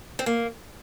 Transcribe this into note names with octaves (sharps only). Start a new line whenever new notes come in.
C4
A#3